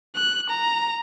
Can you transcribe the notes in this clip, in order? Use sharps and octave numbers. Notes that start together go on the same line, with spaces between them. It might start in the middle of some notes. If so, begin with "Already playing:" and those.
F#6
A#5